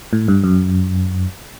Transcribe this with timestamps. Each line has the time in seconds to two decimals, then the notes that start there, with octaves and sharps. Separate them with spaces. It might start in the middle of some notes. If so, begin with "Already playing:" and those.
0.13 A2
0.28 G2
0.44 F#2